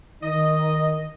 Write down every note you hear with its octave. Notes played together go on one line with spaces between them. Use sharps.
D#3 D#4 D#5